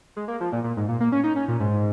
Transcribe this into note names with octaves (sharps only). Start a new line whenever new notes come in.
G#3
A#3
F3
A#2
A#2
G#2
A#2
A#3
C#4
D#4
C#4
A#2
G#2